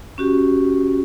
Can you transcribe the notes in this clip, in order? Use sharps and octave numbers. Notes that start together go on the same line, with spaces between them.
C#4 F#4 G4